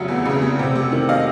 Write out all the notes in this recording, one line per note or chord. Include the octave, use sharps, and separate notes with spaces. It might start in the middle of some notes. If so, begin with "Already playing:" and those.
Already playing: F1 C#3 F#3 E5 F#5
E2
C#3
F1
C3
F1
D#3
D#5 F5